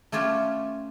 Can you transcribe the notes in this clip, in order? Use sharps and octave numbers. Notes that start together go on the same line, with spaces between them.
A3 C#4 F4 G4